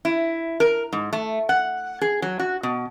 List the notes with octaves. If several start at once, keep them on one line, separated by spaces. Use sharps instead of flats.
E4
A#4
G#2
A3
F#5
G#4
F#3
F#4
B2